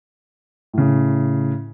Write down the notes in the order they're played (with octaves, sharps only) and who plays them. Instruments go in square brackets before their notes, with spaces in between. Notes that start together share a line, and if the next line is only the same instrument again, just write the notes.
[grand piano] A2 C#3